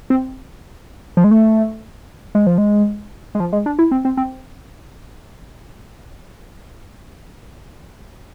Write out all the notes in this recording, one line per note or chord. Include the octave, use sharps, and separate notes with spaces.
C4
F3
G#3
A3
G#3
F3
G#3
G#3
F3
G#3
D4
E4
C4
C4
C4